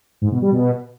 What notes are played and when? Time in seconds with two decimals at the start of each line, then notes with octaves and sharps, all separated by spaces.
0.22 G#2
0.32 B2
0.42 G3
0.52 B2